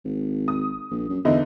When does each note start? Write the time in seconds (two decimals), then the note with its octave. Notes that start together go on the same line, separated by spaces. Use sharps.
0.05 G#1
0.48 D#6
0.91 A#1
1.09 F#2
1.25 E2 D3 D#4 E4